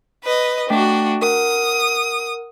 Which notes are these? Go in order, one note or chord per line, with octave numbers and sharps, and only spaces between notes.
B4 D#5
A3 D4 F#4 G5 B6
A#4 F#5 D#6